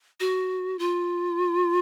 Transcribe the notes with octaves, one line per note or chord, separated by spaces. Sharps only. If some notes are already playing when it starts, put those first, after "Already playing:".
F#4
F4